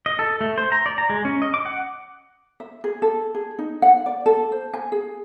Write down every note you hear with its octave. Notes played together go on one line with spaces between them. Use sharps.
D#5
A4
A3
C5
A#5
D5
A#5
G#3
C#4
D#5
D6
F#5
E5
G#4
A4
G#4
D#4
F#5
D5
A4
C5
G#5
G#4